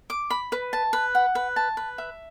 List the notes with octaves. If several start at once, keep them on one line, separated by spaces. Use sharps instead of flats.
D6
B5
B4
A5
B4
F#5
B4
A5
B4
E5